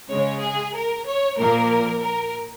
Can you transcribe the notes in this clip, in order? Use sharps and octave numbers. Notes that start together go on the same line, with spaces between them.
C#3 G#3 C#5
G#4
A#4
C#5
A#2 F3 A#3 A#4
A#4